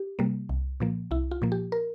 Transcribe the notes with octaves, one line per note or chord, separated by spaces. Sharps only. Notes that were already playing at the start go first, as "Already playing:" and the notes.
Already playing: G4
C3 G3 A#3
C2
A#2 F3 A#3
C2 E4
F4
A#2 F3 A#3
G4
A#4